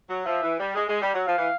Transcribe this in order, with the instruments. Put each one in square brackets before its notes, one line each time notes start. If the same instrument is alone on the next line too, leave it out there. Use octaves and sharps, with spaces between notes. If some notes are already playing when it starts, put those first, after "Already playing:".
[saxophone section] F#3
[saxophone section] F3 [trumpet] E5
[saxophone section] E3
G3
G#3
G#3
G3
F#3
[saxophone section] F3 [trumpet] F5
[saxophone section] E3